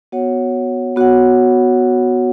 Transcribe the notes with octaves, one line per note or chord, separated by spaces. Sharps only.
B3 F#4 C#5 F#5
B3 F#4 C#5 F#5